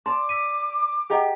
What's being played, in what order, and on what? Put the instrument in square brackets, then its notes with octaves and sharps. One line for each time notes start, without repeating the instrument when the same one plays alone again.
[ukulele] D5 A5 [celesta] C6 [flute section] D6
[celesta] E6 B6 D#7
[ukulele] G4 G5 A#5 [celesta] G#4 D#5 F#5